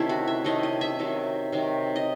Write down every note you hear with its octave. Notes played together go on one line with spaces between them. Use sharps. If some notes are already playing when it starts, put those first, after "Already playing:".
Already playing: C3 D#3 A3 C#4 E4
F#4
E5
C3 D#3 A3 C#4 D#5
D#5
E5
C3 D#3 F#3
C3 D#3 F#3
D#5